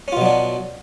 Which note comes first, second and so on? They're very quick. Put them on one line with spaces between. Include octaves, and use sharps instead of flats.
C#4 F4 B2 F#3 D4